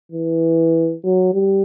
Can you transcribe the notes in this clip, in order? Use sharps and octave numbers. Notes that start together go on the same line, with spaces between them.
E3
F#3
G3